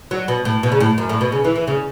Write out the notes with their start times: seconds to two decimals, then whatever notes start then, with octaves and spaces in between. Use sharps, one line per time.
0.11 F#3
0.28 B2
0.45 A2
0.63 B2
0.72 C#3
0.80 A2
0.98 F#2
1.09 A2
1.21 B2
1.32 C#3
1.44 E3
1.56 E3
1.67 C#3